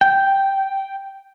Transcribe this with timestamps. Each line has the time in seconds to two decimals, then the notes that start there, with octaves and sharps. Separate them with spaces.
0.01 G5